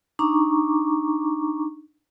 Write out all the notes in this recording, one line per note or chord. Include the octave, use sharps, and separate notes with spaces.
D4 D#4 A#5 C#6 D6